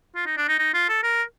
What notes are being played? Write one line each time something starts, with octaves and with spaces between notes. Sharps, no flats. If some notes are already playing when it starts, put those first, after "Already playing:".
F4
D#4
D4
D#4
D#4
F4
A4
A#4